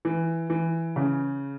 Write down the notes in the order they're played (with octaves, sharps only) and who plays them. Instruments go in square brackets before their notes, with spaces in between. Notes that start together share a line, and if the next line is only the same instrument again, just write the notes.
[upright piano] E3
E3
C#3